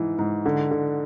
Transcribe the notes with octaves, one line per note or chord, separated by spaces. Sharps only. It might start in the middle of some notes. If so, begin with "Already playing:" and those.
Already playing: G#2 E3
G#2
D3
D3